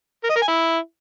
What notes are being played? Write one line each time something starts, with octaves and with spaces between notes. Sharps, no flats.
A#4
D#5
A#4
G#5
E4